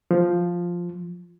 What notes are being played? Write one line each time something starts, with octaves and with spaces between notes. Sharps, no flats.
F3